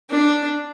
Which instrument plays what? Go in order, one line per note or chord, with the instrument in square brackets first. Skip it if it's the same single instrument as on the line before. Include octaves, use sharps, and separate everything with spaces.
[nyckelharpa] D4